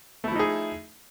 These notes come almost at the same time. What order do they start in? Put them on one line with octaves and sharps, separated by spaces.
A3 E4 F3 D#4 G#4